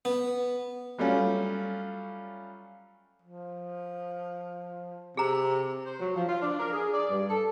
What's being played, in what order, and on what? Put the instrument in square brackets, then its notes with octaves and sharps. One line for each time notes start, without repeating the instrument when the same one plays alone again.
[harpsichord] B3
[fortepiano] F#3 G3 A3 C#4 F4
[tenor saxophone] F3
[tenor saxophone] C3 [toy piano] G#4 A#5
[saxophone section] C5
F#3
F3
F4
D4
A#4
G#4
D5
G2
A4